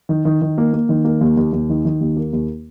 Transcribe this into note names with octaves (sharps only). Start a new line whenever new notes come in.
D#3
D#3
D#3
A#3
A#3
D#3
A#3
D#2
D#2
D#2
D#3
D#3
D#2
A#3
D#2